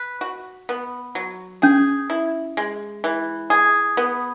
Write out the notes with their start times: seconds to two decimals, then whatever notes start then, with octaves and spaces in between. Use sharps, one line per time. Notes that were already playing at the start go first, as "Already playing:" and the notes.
Already playing: B4
0.21 F#4
0.69 B3
1.15 F#3
1.62 C#4 G#4
2.10 E4
2.57 G#3
3.04 E3
3.50 G#4
3.97 B3